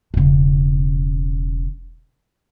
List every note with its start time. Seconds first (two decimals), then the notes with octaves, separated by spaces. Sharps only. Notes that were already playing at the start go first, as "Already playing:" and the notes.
0.14 E1 C#3